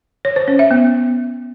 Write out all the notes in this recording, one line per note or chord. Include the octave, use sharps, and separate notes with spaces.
C#5
C5
C#4
E5
B3